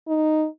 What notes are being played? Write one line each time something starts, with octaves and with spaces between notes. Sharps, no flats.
D#4